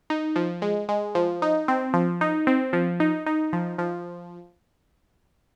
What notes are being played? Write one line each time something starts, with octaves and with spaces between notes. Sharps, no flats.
D#4
F3
G#3
G#3
F3
D#4
C4
F3
D#4
C4
F3
D#4
D#4
F3
F3